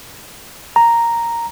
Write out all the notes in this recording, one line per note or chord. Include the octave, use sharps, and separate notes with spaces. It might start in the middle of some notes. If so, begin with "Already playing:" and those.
A#5